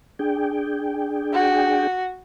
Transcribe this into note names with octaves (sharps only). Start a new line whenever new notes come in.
D4 G#4 G5
F#4